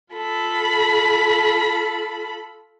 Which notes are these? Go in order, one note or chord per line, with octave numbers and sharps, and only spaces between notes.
F4 A4 B5